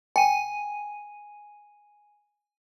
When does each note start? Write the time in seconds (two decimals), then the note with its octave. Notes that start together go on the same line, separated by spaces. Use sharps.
0.16 G5 G#5 D#7